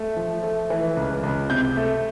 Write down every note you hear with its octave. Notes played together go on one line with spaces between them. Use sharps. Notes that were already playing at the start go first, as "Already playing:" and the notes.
Already playing: A3
F3
A3
E3
C#2
C#2
C3 G6
A3